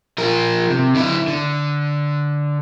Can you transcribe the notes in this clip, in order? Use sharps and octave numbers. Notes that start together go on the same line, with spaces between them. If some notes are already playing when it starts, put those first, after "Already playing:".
F3 A#4
C3
D3 E4
D3